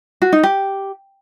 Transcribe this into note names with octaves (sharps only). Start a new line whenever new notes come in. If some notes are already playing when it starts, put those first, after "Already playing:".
F#4
D#4
G4